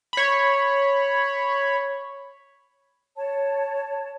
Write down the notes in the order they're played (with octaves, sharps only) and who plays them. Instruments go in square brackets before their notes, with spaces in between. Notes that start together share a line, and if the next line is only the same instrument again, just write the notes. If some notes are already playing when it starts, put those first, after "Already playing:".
[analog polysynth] C#5 B5
[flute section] C#5 A5